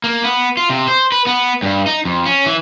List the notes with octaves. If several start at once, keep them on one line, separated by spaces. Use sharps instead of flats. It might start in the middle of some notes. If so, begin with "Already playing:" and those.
A#3
B3
F4
C3
C5
B4
B3
G2
D#4
F2
C#4
E3